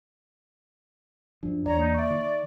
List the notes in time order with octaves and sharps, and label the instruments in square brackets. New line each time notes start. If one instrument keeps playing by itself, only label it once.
[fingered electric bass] F#2 F3 [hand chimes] D4
[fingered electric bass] E2 [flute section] C#5 A#5 [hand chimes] D5
[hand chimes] A#3 [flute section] D#4
[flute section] D5 [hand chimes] E5 C#6
[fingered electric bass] D#3